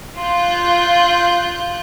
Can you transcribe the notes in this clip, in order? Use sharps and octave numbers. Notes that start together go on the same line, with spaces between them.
F4 F#6 G6